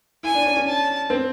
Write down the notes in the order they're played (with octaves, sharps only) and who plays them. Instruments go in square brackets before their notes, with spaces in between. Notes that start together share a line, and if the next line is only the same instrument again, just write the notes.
[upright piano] E4 [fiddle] G#5
[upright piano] D4
C#4
C#4
[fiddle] A5
[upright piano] C4